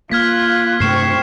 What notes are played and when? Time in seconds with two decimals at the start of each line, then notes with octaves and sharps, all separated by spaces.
0.12 A#3 F4 F6 F#6 G#6 B6
0.80 G2 C3 A3 C4 C#6 C7 E7